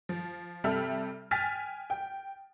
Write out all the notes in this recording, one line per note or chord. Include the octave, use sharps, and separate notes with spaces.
F3
C3 G3 A4 E5 F6
G5 G#5 F6 A6 B6
G5